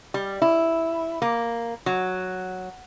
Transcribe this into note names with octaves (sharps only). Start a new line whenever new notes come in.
G3
E4
A#3
F#3